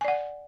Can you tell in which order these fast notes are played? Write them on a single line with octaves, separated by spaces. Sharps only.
G#5 D5 F#5